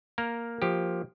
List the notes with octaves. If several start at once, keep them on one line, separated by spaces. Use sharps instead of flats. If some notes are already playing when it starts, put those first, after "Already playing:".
A#3 A#4
F3 G4